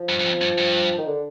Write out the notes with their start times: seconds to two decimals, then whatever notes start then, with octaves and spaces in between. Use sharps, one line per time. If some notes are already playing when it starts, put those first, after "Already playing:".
Already playing: F3
0.09 G2
0.20 G2
0.25 F2
0.41 G2
0.58 G2
0.98 D#3
1.06 D3